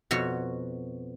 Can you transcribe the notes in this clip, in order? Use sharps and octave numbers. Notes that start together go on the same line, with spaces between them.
F2 B2 F#4 C#5